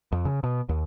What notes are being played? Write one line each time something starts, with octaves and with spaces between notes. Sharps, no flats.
F2
C#3
B2
D#2